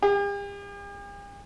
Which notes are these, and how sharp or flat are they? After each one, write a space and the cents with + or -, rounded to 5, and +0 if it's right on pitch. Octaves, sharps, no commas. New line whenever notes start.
G4 +45